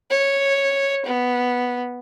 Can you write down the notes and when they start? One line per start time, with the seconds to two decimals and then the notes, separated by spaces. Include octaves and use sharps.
0.10 C#5
1.06 B3